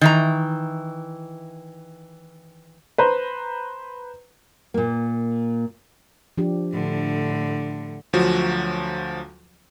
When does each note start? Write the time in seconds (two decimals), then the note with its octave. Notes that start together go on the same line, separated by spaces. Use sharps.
0.01 D#3 E3 A#5
2.98 B4 C5 A#5
4.74 A#2 A#3
6.38 F3 D4 G4
6.73 A2 D3
8.13 D2 F3 F#3 F#4